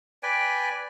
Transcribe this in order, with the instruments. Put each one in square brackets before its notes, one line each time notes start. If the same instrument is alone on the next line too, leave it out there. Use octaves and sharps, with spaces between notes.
[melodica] B4 D5 G5 G#5